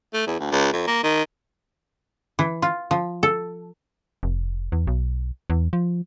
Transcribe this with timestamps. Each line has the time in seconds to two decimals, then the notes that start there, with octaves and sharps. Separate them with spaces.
0.14 A3
0.26 E2
0.40 D2
0.51 C#2
0.73 F2
0.87 A#3
1.03 D#3
2.39 E3
2.62 F4
2.91 F3
3.23 A4
4.23 F1
4.72 E2
4.87 B1
5.50 E2
5.73 F3